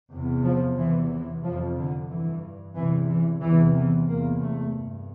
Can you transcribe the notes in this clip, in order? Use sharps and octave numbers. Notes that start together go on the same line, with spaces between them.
E2 C3
F3
E2 C3 E3
E3
F2 C3 F3
D3
G2 E3
E2 C3 E3
E3
E2 C3 E3
E3
E2 C3 A#3
A3
G2